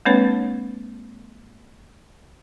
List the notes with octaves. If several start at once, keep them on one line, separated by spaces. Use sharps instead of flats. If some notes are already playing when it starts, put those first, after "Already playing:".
G#3 A#3 C4 D4 B4 C#5